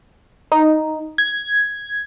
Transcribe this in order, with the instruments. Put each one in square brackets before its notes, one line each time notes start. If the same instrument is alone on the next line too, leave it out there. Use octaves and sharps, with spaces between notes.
[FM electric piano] D#4
G#6